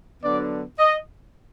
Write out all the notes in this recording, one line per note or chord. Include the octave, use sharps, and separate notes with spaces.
D3 F#3 B3 D4 D5
D#5